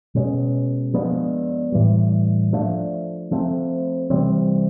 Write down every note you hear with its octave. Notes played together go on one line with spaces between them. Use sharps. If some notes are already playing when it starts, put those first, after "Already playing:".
B2 G#3 C#4
F3 G#3 B3 D4
A2 E3 G3
F3 A3 D4
F3 A3 C4
C3 E3 G3 C4